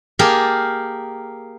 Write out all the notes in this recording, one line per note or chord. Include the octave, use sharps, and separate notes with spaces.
A#3 G4 G#4 A#4 A5